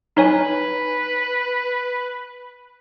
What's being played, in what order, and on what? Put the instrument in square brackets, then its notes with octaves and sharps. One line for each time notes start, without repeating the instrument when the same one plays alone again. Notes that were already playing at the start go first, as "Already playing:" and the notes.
[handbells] D#4 C#5 G#5 [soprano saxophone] B4